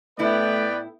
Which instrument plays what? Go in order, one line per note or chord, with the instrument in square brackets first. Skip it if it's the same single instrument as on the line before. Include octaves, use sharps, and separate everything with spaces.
[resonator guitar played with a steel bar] A2 E4 [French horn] A3 [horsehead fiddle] B3 G5 [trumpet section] B4 D5